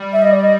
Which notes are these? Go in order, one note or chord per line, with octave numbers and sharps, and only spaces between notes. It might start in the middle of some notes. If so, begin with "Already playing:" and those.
Already playing: G3
E5
D#5
D5
D#5